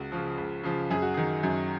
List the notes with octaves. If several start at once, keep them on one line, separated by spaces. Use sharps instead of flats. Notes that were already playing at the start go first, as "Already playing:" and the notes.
Already playing: C#2 F#4
C#3 F3
C#2
C#3 F3
F#2 G#4
F#4
D#3 G#4
F#2